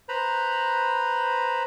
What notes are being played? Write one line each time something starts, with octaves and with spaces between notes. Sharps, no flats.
B4 C5 A#5 B5